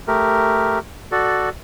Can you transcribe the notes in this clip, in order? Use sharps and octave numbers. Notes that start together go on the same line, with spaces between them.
A3 G4 A#4
F#4 A4 D5